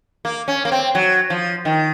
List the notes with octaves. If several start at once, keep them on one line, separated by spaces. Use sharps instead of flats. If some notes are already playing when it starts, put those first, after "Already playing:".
A#3
C#4
A#3
C4
F#3
F3
D#3